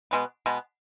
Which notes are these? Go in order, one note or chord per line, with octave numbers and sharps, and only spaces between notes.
B2 G#3 B3
B2 G#3 B3